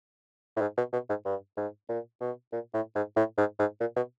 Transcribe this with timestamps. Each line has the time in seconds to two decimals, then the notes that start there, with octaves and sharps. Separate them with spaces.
0.57 A2
0.61 G#2
0.78 B2
0.93 B2
1.09 G#2
1.25 G2
1.57 G#2
1.89 A#2
2.21 B2
2.52 A#2
2.74 A2
2.95 G#2
3.16 A2
3.38 G#2
3.59 G#2
3.80 A#2
3.96 B2